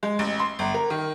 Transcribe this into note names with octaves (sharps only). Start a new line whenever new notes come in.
G#3
A1
C6
G1
A#4
D#3